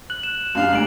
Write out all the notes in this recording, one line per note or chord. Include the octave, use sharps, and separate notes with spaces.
F#6 F#7
E7
F#2 D4 G4 F5
D2 G#2 D7 F#7